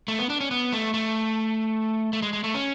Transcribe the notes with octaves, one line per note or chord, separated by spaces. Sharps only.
A3
B3
D4
C#4
B3
A3
A3
A3
G#3
G#3
A3
C#4